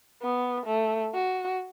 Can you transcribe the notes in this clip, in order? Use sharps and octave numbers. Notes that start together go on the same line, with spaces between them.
B3
A3
F#4